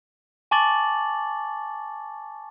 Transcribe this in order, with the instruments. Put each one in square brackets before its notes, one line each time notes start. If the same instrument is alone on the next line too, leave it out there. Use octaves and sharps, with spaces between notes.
[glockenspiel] G#5 A5 C#6 D6 A6 F#7